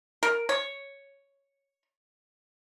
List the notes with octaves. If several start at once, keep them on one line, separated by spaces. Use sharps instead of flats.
A#4
C#5